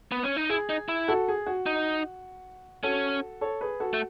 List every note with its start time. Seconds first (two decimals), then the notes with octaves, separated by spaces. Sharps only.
0.12 B3
0.23 C#4
0.37 D#4
0.50 E4 G#4
0.69 D#4
0.89 E4
1.08 F#4 A4
1.28 G#4
1.47 F#4
1.66 D#4
2.83 C#4 F#4 A4
3.41 A4 C#5
3.61 G#4 B4
3.80 F#4 A4
3.93 A3